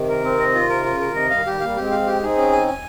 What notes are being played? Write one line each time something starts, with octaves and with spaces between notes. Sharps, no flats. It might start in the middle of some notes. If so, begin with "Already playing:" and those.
Already playing: C3 D#3
A#4
C4
D#5
F4
D#3 A#4
C#3 F4
A#4
C3 D#3
D#5
D#3 G3 F5
D#3 G3 G4
G3 A#3 F5
G#3 C4 G4
F5
G4
C4 D#4 G#4
C#4
G#5
G#5